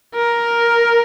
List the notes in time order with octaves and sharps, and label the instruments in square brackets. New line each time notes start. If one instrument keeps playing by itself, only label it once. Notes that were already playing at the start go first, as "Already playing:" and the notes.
[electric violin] A#4